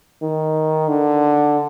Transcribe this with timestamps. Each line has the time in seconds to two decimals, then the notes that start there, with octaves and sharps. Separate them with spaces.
0.22 D#3
0.88 D3